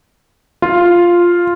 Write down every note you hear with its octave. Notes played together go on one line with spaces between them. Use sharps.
F4